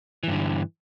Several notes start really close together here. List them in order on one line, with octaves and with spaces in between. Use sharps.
E3 G2 D3